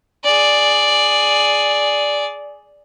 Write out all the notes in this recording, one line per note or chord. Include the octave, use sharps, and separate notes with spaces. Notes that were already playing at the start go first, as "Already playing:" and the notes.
G#4 D5